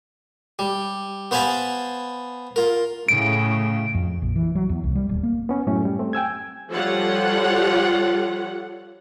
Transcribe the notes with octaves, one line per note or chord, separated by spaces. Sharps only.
G3
B3 C5 F5 G#5 A5 B5
F4 A#4
A2 C#3 D7
F2
A#1
E3
F#3
E2
C2
G3
D#1
A#3
B3 C#4
F#2 A2 A3 C#4
G3
A3 C4
G5 G#5 E6 G#6
F3 G3 F4 A4 C#5 F#5